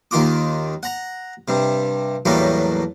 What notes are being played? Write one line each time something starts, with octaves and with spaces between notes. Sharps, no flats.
D#2 D#3 F4 D6
F#5 A#5
G2 C3
E2 A2 F#3 G3 A3 A#3